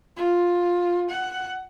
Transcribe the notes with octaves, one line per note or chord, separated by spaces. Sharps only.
F4
F#5